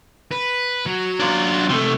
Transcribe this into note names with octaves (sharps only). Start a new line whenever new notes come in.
B4
F#3
D4 F4
C3 A3